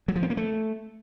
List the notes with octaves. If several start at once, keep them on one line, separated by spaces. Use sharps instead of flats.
F#3
F3
C4
A#3
A3